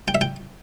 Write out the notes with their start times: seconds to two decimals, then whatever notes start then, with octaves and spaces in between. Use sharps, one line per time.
0.08 G5
0.15 E5
0.21 G5